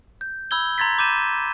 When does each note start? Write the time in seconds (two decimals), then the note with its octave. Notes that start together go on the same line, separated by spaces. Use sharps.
0.21 G6
0.51 B5 E6 G6 G#6 G7
0.78 A#5 C6 G#6 A6 B6
0.98 B5 D6 G6 A6 D#7 E7